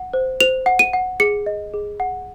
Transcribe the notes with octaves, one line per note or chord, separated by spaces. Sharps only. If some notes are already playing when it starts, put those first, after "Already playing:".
Already playing: F#5
C5
C5 F7
F#5
D#7
F#5
G#4 C#7
D#5
G#4
F#5